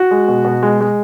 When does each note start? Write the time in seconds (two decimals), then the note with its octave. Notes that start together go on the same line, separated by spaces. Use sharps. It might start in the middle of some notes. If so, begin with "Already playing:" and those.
Already playing: F#4
0.11 G#3
0.28 B2
0.45 B2
0.63 G#3
0.81 G#3